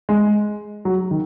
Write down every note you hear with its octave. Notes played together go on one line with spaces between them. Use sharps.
G#3
F#3
D#3